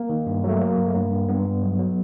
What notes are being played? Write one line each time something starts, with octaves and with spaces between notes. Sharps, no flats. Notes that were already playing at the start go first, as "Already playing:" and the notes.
Already playing: A#3
D#3
G2
F#3 A3
F#3 A#3
G2
A3
G2 A#3
G2
G2 B3
G2
F#3
F#3